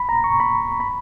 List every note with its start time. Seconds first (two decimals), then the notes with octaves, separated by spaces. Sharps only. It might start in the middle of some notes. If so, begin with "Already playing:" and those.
Already playing: B5
0.09 A#5
0.24 C#6
0.40 B5
0.80 B5